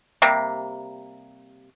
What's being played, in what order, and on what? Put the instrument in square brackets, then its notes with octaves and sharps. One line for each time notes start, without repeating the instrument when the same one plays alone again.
[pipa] C3 G3 A#3